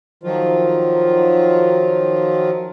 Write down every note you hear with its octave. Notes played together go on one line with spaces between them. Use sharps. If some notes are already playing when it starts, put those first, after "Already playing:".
D#3 F3 F#3 F4